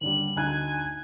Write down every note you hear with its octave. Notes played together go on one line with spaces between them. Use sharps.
D#2 D3 G3 F#7
D2 D#4 G#5 F#6